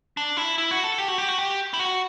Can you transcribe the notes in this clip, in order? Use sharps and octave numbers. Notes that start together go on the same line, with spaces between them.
D4
E4
E4
F#4
A4
G4
F#4
G4
F#4
G4
E4
F#4